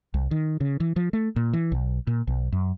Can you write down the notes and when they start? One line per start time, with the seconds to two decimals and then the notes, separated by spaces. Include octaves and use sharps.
0.14 C2
0.31 D#3
0.61 C#3
0.80 E3
0.96 F3
1.13 A3
1.36 A#2
1.53 E3
1.72 B1
2.07 A#2
2.27 B1
2.52 F#2